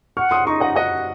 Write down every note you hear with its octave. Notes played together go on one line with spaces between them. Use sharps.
F#5 C#6 F6
C6 D#6
D#4 A#5 C#6
D#5 F#5
F#4 D#5 F#5